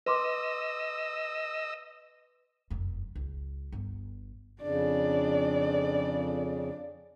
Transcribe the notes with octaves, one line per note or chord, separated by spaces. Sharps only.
B4 D#5 C6 D6 E6
F1 F#2
C#2
G1
F2 C#3 D4 D5